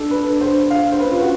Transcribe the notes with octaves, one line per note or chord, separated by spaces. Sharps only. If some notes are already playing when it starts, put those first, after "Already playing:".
Already playing: D4 A4
B4
C5
F5
C5
C#4 B4
F4
F#4